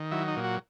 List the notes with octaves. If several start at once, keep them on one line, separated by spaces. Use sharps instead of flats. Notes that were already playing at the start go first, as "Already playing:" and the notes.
Already playing: D#3
F#3 E4
D#4
A#2
F#4